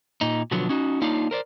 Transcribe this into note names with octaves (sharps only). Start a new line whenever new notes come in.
A#2 D#4
B2 D3 F3 F#3 B3
C#4 D#4 F#4
A#3 D4 D#4 F4 C#5 F5
A#4 C5 D5